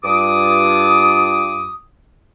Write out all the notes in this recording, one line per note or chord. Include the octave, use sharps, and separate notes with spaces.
G2 F4 D6 D#6